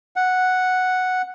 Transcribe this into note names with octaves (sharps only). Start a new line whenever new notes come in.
F#5